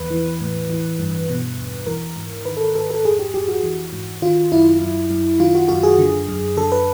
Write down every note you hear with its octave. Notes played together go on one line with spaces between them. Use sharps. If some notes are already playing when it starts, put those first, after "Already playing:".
Already playing: E2 B4
E3
A2
E3
G2
B2
E2
E3 A#4
G#2
D#3 B4
A4
A#4
G#2 A4
A4
F2 G#4
G4
F2 G4
F#4
E3
G#2
D#3 F4
F#2 E4
F#2
F#2
D#3 F4
F#4
F#2 F#4
G#4
D3
F#2
D3 A4
B4